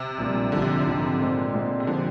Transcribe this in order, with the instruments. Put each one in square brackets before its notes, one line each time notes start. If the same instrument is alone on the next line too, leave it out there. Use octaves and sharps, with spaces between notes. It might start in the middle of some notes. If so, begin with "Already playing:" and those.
Already playing: [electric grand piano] C3
[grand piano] A#1 A#2 G3
[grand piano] G#1 G#2 F3 [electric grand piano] D3
[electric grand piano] C3
D3
[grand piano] G#1 G#2 F3
A#2 G#3 C4 D#4
A#2 G#3 C4 D#4
[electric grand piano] C3
[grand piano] A#2 F3 C4 G4 [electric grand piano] D3